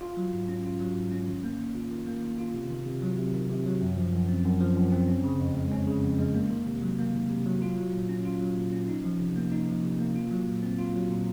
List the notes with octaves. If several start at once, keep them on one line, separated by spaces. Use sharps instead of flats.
F4
F#3
G#2
C#4
F4
F#3
G#2
C#4
D#3
A#3
D#3
F4
D#3
A#3
D#3
F4
C3
D#3
C3
F#3
C3
D#3
C3
F#3
F#2
F3
F#2
C4
F#2
F3
F#2
C4
C#4
C#3
F2
G#3
C#4
C#3
F2
G#3
A#3
D#3
C3
F#3
A#3
D#3
C3
F#3
F4
F#3
A#2
C#4
F4
F#3
A#2
C#4
D#4
F3
C3
A#3
D#4
F3
C3
A#3
F4
F#3
A#2
C4
F4
F#3
A#2